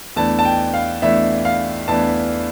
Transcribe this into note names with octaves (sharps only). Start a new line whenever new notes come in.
E2 E3 A3 D4 A5
A5
G5
F5
E2 E3 A3 D4 E5
F5
E2 E3 A3 D4 A5